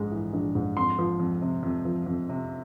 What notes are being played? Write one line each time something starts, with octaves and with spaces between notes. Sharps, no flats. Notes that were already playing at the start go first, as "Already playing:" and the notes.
Already playing: A#1 G#2 G#3
E3
A#1
G#2
F2 C6
F3
F2
C3
F2
F3
F2
C3